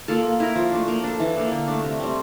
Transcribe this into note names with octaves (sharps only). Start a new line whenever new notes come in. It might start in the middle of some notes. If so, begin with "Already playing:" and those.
A#3 F4 A4
A#3
E4 A#4
F3
A3 D4
A#3
D4 A4
E3
A#3 D4 A4
D3
A3 D4
C3
G3 C4